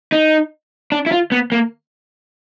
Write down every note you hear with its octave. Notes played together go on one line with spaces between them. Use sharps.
D#4
D4
E4
F4
B3
A#3